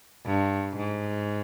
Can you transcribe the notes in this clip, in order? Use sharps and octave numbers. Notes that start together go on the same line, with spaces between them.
G2
G#2